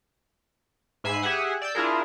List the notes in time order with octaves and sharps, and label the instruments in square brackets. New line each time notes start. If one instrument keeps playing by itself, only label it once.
[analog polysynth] G#2 E5 G#5 B5 C7
G4 G#4 E5 F#5 G#5
D5 E6 G6
D4 E4 F4 G#4 A#4